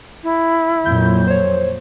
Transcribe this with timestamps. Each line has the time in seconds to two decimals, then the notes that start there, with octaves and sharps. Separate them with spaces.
0.23 E4
0.85 F2 A#2 F#3 G6
1.27 C5 C#5